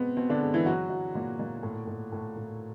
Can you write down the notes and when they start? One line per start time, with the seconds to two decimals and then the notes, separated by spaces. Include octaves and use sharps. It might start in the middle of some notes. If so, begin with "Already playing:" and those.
Already playing: B2 G#3 B3 C4
0.17 B2 C4
0.29 D3 D4
0.41 G#3
0.54 E3 E4
0.66 F#3 F#4
0.90 F#3
1.15 A#2
1.39 A#2
1.63 A2
1.87 A2
2.12 A2
2.37 A2